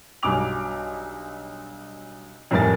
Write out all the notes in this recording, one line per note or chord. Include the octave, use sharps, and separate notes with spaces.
B1 G2 F#3 G#5 D6 F7
F2 A2 G3 A#4 G#5 A6